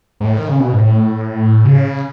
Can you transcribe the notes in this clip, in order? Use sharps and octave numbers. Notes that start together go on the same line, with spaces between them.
G#2
A2
D#3
C#3
B2
G#2
A2
C#3